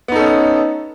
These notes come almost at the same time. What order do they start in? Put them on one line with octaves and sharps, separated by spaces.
B3 D#4 A4 C#4